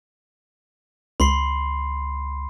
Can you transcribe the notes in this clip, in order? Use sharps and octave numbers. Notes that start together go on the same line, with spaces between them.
C#2 B5 C6 C7